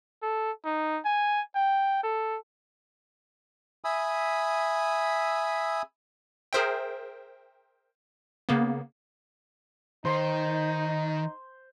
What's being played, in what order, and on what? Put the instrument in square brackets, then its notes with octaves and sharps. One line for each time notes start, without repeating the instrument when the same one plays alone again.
[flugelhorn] A4
D#4
G#5
G5
A4
[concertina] E5 G#5 B5 D#6 E6
[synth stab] G#4 A#4 C5 E5 G5
C#3 A#3 B3
[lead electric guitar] D#3 [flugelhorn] D#4 [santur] C5 C6